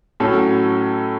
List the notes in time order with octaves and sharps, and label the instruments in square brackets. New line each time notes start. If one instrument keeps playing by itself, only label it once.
[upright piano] A2 F#3 C#4 A4